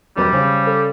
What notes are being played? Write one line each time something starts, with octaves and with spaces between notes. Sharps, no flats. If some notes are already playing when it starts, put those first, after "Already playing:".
E1 F#2 G3 B4
C#3 C#4 C5
A4